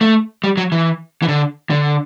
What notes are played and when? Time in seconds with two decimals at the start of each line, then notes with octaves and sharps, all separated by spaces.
0.01 A3
0.44 G3
0.57 F#3
0.72 E3
1.22 E3
1.28 D3
1.70 D3